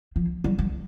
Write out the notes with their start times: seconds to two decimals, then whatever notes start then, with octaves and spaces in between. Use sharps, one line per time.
0.16 F3
0.44 G3
0.59 G3